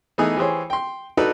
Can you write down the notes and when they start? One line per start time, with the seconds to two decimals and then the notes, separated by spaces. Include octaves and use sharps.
0.18 E3 A3 B3 D#4 G#4
0.36 E3 G4 G#4 C5 C#5
0.70 G5 C6
1.17 D4 D#4 F#4 A4 B4 D5